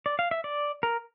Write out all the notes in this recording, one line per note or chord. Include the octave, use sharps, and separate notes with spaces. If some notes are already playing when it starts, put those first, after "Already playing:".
D5
F5
E5
D5
A#4